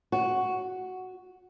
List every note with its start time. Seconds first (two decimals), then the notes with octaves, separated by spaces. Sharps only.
0.12 F#4